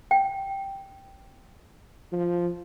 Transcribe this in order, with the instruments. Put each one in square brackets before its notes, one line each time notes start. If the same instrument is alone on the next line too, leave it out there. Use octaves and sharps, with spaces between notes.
[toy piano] G5
[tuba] F3